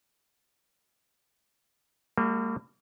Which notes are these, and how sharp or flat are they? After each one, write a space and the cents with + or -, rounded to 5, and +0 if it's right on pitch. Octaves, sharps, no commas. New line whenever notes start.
G3 +40 A#3 -35 F#4 +0